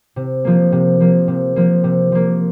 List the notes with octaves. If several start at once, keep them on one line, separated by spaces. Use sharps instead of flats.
C3
F3 A#3
C3
F3 A#3
C3
F3 A#3
C3
F3 A#3